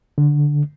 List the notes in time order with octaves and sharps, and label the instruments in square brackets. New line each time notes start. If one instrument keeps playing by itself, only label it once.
[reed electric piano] D3